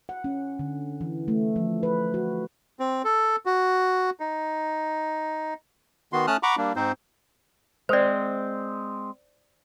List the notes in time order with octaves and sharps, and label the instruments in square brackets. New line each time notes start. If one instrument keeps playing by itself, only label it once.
[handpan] F#5
C#4
D3
E3
A3
F3
B4
F#4
[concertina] C4
A4
F#4
D#4
[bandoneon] D#3 B3 F#4 C6
A3 C#4 A5 D#6 F6 F#6
F#5 A#5 B5 C#6 D6
G3 A#3 D4
G#2 C4 D#4 C5
[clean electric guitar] G#3 C4 [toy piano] C5 D5